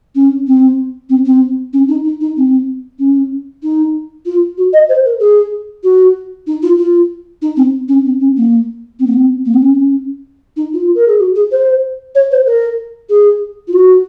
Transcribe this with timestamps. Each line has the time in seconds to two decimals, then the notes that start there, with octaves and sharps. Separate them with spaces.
0.15 C#4
0.47 C4
1.09 C4
1.25 C4
1.73 C#4
1.88 D#4
2.04 D#4
2.21 D#4
2.37 C4
2.99 C#4
3.63 D#4
4.25 F4
4.57 F#4
4.73 D#5
4.89 C5
5.05 A#4
5.20 G#4
5.83 F#4
6.47 D#4
6.62 F4
6.78 F4
7.42 D#4
7.57 C4
7.88 C#4
8.05 C4
8.20 C#4
8.37 A#3
8.99 C4
9.06 A#3
9.13 C4
9.46 A#3
9.54 C4
9.62 C#4
10.56 D#4
10.73 F4
10.95 A#4
11.08 G#4
11.20 F#4
11.35 G#4
11.52 C5
12.15 C#5
12.31 C5
12.46 A#4
13.09 G#4
13.68 F4
13.73 F#4